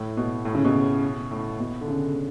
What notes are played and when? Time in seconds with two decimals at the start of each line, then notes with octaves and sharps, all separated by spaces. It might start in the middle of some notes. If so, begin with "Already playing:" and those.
Already playing: A2
0.17 B2
0.45 A2
0.55 C#3
0.65 B2
1.31 A2
1.60 B2
1.81 D3
1.88 C#3